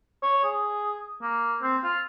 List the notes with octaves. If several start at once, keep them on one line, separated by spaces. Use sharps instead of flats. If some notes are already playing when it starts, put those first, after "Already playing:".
C#5
G#4
A#3
C4
F4